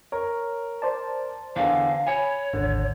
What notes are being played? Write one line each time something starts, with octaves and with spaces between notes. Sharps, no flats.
A#4 C#5
C5 D5 A5
E2 D3 F5
C#5 G#5 B5 C#7
G#1 D#2 D3